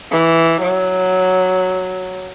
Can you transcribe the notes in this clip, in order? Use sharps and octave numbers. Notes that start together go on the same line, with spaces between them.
E3
F#3